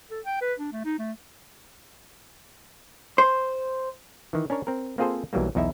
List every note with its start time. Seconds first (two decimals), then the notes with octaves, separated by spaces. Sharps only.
0.11 A4
0.25 G5
0.41 B4
0.59 D4
0.72 A3
0.85 D#4
0.99 A3
3.18 C5
4.33 D#3 E3
4.50 C#4 D4 A#4 C#5
4.67 C4 A#4
4.98 A#3 C4 F4 G#4 A4 C5
5.33 B1 E3 F#3 G3 A#3
5.55 B1 E2 D#4 E4 E5